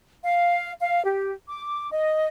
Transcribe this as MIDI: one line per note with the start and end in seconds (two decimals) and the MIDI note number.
0.23 0.72 77
0.81 1.00 77
1.04 1.32 67
1.48 1.87 86
1.91 2.26 75